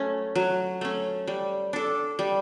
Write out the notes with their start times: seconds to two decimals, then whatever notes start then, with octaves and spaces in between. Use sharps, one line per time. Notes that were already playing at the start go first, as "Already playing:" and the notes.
Already playing: F#3 A3 C#4
0.35 F#3
0.81 A3 C#4
1.28 G3
1.73 D4 A4
2.19 G3